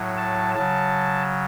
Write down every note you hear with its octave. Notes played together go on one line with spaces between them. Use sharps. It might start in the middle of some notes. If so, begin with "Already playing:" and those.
Already playing: A2 F#3
A5
C#3 F#3 A5